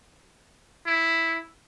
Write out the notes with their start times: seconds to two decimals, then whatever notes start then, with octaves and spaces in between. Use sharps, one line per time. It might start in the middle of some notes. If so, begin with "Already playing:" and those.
0.86 E4